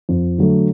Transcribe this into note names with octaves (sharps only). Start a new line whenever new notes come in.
F2
D3 F#3 A3